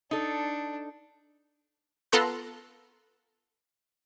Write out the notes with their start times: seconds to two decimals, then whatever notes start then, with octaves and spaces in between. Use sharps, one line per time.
0.11 D4 D#4 A4
2.12 B3 F4 A4 A#5 C6 F#6